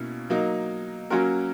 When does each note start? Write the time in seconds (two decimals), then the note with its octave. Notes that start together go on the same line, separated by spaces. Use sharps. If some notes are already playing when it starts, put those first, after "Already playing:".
Already playing: B2 A#3 C#4 E4
0.30 F#3 A#3 D#4
1.10 F#3 A#3 C#4 F#4 A#4